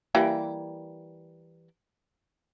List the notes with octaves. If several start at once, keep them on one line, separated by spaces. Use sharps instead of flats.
E3 G3 A#3